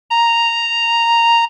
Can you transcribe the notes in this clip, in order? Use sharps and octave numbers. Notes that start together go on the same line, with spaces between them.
A#5